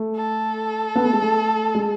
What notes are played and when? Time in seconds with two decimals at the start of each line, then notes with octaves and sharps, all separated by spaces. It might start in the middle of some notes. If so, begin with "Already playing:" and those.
Already playing: A3
0.16 A4
0.95 B3
1.04 A3
1.13 G#3
1.22 A3
1.75 G#3